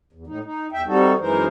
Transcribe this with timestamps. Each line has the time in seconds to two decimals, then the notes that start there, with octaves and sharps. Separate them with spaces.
0.13 E2
0.27 A2 D#4
0.44 D#4
0.72 E2 E5 G5
0.86 C3 G3 D#4 F#4 A4
1.20 F#2 E3 G#3 D#4 A#4 C5